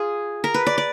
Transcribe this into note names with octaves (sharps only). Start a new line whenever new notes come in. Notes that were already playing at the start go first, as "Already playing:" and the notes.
Already playing: F4 G#4
A#4
B4
D5
D5